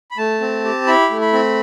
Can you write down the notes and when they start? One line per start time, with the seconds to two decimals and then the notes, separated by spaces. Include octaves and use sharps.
0.11 B5
0.17 A3 A5
0.41 C4
0.65 G4
0.87 E4 B5
1.10 A3
1.21 B5
1.33 C4